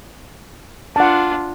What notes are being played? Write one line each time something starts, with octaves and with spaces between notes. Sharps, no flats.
D4 F4 F#5 A5